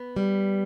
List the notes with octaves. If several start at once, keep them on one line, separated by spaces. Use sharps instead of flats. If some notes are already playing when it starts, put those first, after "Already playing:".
Already playing: B3
G3